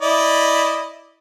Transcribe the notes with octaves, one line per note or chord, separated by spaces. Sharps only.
E4 D5 D#5